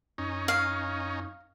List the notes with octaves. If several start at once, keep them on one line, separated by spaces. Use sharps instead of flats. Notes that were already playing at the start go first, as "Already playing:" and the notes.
F#2 C#4 D#4
F5